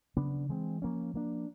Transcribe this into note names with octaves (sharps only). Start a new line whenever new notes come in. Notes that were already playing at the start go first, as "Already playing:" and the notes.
C#3 F#3 B3 D4
E3 G#3 C4
F3 A#3 C#4
F3 A#3 D4